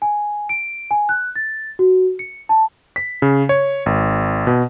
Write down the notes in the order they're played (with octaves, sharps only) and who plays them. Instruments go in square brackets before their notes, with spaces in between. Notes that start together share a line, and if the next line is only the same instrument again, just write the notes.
[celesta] G#5
D7
G#5
F#6
A6
F#4
C#7
A5
[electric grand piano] B6
C#3
C#5
G#1
B2